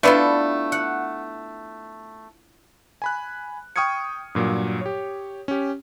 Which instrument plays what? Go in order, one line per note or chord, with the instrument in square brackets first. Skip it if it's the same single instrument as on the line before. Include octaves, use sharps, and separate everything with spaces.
[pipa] A3 B3 [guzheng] D4 E4 F4
[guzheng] F#5
[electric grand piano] G#5 B5 F#6
G5 C#6 D#6 F6 G#6 C#7
G2 A#2 F#3
G4 C#5
C#4 G4